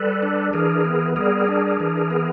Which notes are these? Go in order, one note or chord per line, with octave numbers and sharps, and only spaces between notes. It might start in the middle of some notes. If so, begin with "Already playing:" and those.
Already playing: G3 A4 B4
D4
E3 G#4 A#4
B3
G3 G#4 A#4
D4
E3
B3